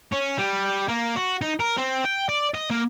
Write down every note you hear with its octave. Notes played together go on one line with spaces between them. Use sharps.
C#4
G3
A#3
F#4
D#4
A#4
C4
G5
D5
D#5
A#3